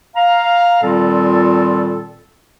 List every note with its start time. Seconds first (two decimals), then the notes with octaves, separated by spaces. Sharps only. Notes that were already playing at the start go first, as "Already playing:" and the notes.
0.16 F5 A#5
0.83 A#2 D#3 G3 C4 F4 A4